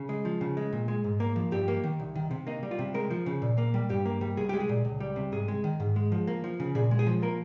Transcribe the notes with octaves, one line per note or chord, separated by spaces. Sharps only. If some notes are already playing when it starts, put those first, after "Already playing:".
Already playing: C#3
G#3
F3
C#3
G#3
A#2
G#3
G#2
A#3
F3
G2 G4
A#3
D#3
C2
D#3
C3
A#3 D#4
G3
F4
C3
G#3 A#4
F3
C#3
A#2
A#3
G3
G2 G4
A#3
G3
C2 G#4
G#3 G4
G#4
A#2
C#2
G3
C3
G#2 G#4
G#3
D#3
G#2
G#3
F3
A#3
F3
C#3
A#2 G#4
G#3
G#4
F3
A#3 A#4